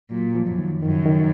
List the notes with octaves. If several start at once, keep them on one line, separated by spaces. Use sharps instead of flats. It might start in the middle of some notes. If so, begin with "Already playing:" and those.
A#2 F#3
F3
F#2
D#3
F#2 D#3
C#3
D#3